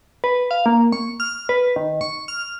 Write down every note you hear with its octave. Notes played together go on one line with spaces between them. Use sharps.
B4
F5
A#3
C#6
F6
B4
D#3
C#6
F6